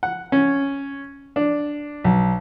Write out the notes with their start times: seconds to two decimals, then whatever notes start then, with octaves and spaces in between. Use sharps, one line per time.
0.03 F#5
0.32 C#4
1.36 D4
2.04 B1